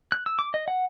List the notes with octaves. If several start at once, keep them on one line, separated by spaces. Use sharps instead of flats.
F#6
E6
D6
D#5
F#5